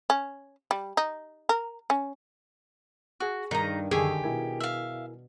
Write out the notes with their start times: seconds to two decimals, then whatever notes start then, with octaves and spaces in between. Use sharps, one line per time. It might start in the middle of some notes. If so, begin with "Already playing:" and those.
0.10 C#4
0.71 G3
0.97 D#4
1.49 A#4
1.90 C#4
3.20 F#4 G#4 C#6
3.51 G2 D#3 D#4 A#5
3.91 F#2 D3 D#3 G4 G#4 C#6 E6
4.24 B2 E4 A#4 G#5
4.60 E5 F5